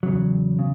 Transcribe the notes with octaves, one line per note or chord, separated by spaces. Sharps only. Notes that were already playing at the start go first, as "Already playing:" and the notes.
E2 C#3 F#3
C#3